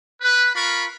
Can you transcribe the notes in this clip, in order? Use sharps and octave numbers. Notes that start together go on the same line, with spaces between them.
B4
F4 A#4 B5 C#6